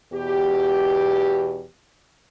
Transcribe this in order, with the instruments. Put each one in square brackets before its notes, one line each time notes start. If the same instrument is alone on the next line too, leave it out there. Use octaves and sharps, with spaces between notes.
[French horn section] E2 B2 G4